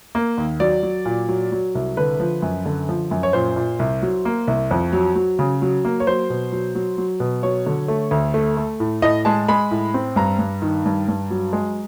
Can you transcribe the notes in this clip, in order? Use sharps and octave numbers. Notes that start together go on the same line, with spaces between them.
A#3
D#2
F#3 D5
F#3
A#2
F#3
F#3
C2
D3 B4
F3
F#2
D3
F3
F#2
C#5
A#2 C5
A#2
C2
F#3
A#3
C2
F2
F#3
F#3
C#3
F#3
A#3
C#5
F#3 C5
B2
F#3
F#3
F#3
B2
F#3 C#5
D3
A3
D2
A3
A3
A2
A2 D#5
G#3 A5
G#3 B5
A2
C4
G2 A#5
G2
D#3
G2
G2
F#3
G#3